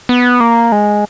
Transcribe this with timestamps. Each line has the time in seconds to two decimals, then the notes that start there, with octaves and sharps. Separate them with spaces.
0.09 B3
0.40 A#3
0.72 G#3